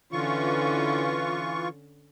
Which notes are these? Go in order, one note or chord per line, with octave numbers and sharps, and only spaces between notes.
D3 E3 C#4 F4 C#6